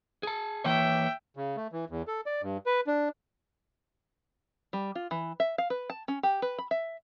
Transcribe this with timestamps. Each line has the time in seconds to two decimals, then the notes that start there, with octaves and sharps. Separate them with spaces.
0.23 G#4 A5
0.64 E3 A#3 C#5 E5 G5
1.36 C#3
1.57 A3
1.72 E3
1.90 E2
2.07 A4
2.26 D5
2.42 G2
2.66 B4
2.87 D4
4.73 G3
4.95 F4
5.11 E3
5.40 E5
5.58 F5
5.70 B4
5.90 A5
6.08 C#4
6.23 G4
6.42 B4
6.58 B5
6.71 E5